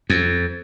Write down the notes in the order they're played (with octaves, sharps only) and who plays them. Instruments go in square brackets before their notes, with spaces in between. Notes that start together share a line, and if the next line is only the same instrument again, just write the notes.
[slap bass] F2